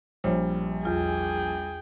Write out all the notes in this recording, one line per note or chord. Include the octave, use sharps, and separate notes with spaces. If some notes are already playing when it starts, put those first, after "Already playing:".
A#1 G3 C5 C#5
E2 F4 G#4 G5